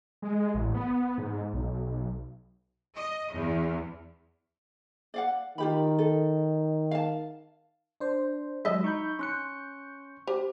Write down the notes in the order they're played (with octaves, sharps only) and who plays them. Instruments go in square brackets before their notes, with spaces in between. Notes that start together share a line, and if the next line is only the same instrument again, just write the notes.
[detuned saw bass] G#3
A1
B3
G#2
B1
[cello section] D#5
E2
[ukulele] D5 F5 F#5
[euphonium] D#3 [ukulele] F4 G4 B5
[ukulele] A4
F5 A5
[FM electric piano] D4 C5
[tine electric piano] F#3 G#3 [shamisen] D#5 E5 [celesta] D#6 E6 B6
[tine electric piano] D#4 B5 [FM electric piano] C#6 G6
[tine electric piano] C#4 C#7 [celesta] C6 F#6
[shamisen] G4 [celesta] C5